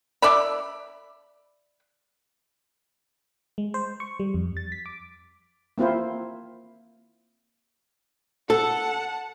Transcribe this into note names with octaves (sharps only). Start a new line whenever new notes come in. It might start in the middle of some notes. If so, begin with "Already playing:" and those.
D5 E5 B5
G#3
C5
C#6
G3
F2
A6
B6
D6
A#3 C4 E4 F4 C5
A4 F#5 A5